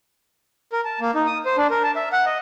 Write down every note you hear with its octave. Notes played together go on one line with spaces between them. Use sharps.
A#4
A5
A#3
D#4
D#6
C5
D4
A#4
A5
E5
F#5
D#5